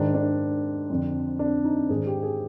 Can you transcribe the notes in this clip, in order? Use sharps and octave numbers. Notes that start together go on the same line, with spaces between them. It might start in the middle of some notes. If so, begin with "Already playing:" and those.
Already playing: G#2 D#3 D4
D4
F2 D3
D4
D#4
G#2 D#3 G#4
G4
G#4